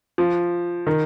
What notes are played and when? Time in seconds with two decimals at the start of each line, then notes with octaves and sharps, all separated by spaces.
0.18 F3
0.87 D#3